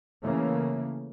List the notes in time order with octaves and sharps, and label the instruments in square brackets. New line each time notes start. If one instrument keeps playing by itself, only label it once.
[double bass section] C#3 E3 A3 A#3